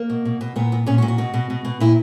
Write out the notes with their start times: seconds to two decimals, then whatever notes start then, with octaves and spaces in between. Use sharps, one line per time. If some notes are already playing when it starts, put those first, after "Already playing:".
Already playing: A#3
0.10 B2
0.25 B2
0.41 B2
0.56 A#2 B3
0.72 A#2
0.86 A#2 C#4
0.98 F#4
1.02 A#2
1.08 F#4
1.18 B2
1.34 B2
1.50 B2
1.65 B2
1.80 A#2 E4